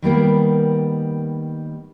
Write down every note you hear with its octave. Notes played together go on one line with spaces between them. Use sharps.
D#3 G3 A#3 B3